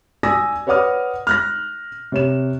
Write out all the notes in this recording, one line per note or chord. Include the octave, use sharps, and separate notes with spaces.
D5 G#5 D#6 E6 A#6
B4 C#5 D5 F#5 D#6 F6
F6 F#6 A#6
C3 C#5 E7